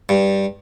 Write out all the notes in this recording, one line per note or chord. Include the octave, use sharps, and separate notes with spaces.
G2